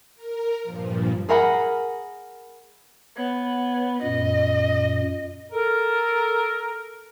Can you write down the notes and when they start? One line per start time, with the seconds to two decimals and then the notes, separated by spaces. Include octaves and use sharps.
0.15 A#4
0.63 G2 A#2 F3
1.29 G#4 A#4 F#5 B5
3.17 B3 C#5
4.03 F#2 A#2 D#5
5.52 A4 A#4